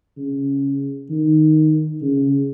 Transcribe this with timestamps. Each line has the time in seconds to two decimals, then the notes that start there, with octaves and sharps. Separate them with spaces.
0.17 C#3
1.10 D#3
2.01 C#3